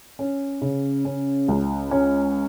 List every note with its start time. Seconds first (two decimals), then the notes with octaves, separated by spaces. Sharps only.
0.19 C#4
0.62 C#3
1.05 C#4
1.48 C#2
1.91 C#4